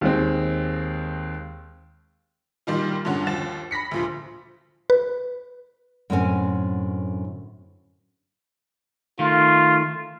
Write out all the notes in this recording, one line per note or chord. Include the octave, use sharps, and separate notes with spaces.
D#2 G#3 C4
A#2 D#3 G3 F4
G2 A#2 D3 C#4 F#5
D#2 F3 A6 E7
B5 A#6 B6 C#7
D2 A#2 F3
B4
F#2 A2 D3 C4 C#4 G#5
D#3 A3 F4